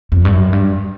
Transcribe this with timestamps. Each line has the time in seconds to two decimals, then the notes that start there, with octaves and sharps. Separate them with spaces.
0.12 F2
0.25 G2
0.33 F#2
0.53 G2